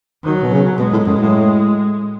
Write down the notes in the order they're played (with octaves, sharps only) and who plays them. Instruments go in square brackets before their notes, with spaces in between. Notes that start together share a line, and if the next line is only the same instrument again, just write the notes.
[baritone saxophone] D#3 [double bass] F#3
[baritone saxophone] B2
C#3
[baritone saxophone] B2 [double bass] G#3
[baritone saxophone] A2
F#2
A2